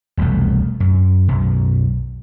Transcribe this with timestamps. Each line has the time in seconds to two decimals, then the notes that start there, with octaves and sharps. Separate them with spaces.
0.17 E1 C2 F2 A3
0.80 F#2
1.28 B1 F#2